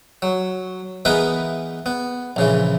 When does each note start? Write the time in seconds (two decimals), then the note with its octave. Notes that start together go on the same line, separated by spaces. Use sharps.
0.22 F#3
1.05 E3 B3 D#4 G#4 A#4 B4
1.86 B3
2.36 A#1 C#3 E3